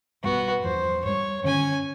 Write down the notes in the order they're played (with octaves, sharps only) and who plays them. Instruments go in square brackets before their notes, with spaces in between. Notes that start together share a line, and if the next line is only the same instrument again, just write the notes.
[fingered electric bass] B1 G2 G3 [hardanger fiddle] B3 F#4
[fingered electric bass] E2 G2 F3 [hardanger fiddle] C5
[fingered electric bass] G2 G3 [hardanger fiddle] C#5
[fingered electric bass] G2 D3 D#3 [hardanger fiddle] C#4 G#5